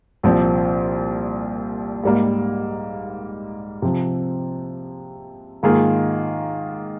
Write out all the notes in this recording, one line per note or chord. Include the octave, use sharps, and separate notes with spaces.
C2 A#2 F3 C4
G#2 G3 A#3
C3 F3 C4
G#2 D#3 A#3 F4 G#4